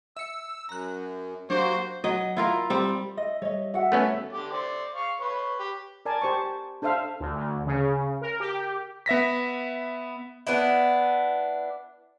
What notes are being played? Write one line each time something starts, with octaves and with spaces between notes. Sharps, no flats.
E5 E6 C#7
F#2 A#5 F#6
F#3 A#3 D4 F#4 G4 C5
F#3 D#5
E4 F4 A#4
G3 C4
D#5 E5
G3 C#5 D#5
G3 F#4 E5 F#5
A3 B3 C#4
D3 G4 D6
C5 D5
F5 C#6
B4 C#5
G4
A#4 D5 G#5 A5
G4 C5 A5 C#6
D4 A4 C5 E5 F5
D2
D2
C#3
A#4
G4
B3 E5 A#6 B6
B3 D4 E4